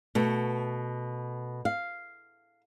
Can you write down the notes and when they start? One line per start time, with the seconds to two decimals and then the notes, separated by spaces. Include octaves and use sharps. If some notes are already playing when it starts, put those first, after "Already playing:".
0.15 B2 A3
1.65 F5